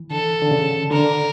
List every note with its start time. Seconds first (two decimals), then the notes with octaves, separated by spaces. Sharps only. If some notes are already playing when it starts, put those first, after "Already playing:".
Already playing: E3
0.11 D3 A4
0.42 D3
0.51 C#3
0.91 D3 A#4